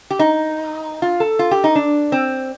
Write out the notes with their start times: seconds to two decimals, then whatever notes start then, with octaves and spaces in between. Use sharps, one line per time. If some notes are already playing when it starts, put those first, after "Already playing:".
0.11 G4
0.19 D#4
1.02 F4
1.20 A4
1.39 F4
1.51 G4
1.64 D#4
1.76 D4
2.12 C4